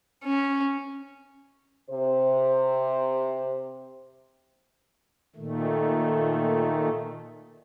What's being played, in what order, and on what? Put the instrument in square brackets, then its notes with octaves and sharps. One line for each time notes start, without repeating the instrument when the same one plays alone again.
[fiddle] C#4
[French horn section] C3 C5
[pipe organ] A#2 D#3 A3